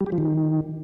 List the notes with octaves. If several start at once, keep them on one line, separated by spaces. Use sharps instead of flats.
G3
G4
F3
D#3